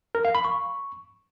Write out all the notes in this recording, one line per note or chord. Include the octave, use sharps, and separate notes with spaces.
A#4
F5
B5
C#6